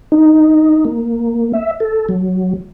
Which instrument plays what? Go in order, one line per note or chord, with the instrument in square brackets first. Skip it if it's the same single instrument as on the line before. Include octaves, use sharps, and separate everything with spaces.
[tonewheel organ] D#4
A#3
E5
A4
F#3